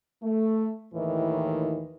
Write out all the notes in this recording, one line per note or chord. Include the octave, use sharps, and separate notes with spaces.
A3
D#2 A2 D#3 E3